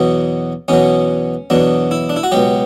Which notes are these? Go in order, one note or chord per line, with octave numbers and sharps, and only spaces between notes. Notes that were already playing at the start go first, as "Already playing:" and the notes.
Already playing: E2 B2 F#3
E2 B2 F#3 C#4
E2 B2 F#3 D4
E4
D4
E4
F#4
C#2 B2 F#3 G4